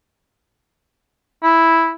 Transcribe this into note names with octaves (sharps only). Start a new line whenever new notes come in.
E4